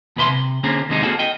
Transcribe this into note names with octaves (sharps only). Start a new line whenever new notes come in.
D#2 B2 B4 E5 C6
C3
D3 A#3 C4 C#4 G#4 A#4
D#2 C3 D#3 G#3 C#4 D#4
A#3 C4 F#4 G#4 A4
D#5 G5